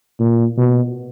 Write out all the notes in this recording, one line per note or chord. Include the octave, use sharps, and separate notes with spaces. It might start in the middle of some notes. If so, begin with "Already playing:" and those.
A#2
B2